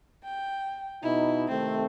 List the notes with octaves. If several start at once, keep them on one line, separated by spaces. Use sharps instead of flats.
G5
B2 D#4 E4
C3 D#3 A3 C4